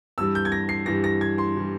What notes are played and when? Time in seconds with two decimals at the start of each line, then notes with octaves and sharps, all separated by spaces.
0.18 G2 E3 G3 E6
0.35 G6
0.45 G#6
0.52 A#6
0.69 C7
0.86 G2 E3 G3 A#6
1.04 A#6
1.21 G#6
1.38 C6
1.57 E3 G3